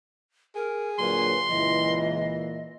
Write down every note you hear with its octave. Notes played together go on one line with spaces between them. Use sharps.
G#4 A#4
A#2 D3 F#3 B4 C6
C#2 A#2 E3 D#5